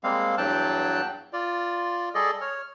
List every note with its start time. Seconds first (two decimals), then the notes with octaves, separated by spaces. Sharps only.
0.03 G3 G#3 A#3 C4 F5
0.38 E2 G2 F#3 G5 A5 F#6
1.33 F4 D5
2.15 G3 G#4 A4 D5 D#5
2.41 C#5 F6